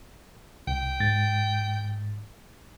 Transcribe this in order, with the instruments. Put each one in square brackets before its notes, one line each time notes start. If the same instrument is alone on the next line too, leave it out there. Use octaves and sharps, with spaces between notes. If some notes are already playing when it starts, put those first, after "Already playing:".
[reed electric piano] C2 [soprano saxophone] G5
[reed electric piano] G#2 A6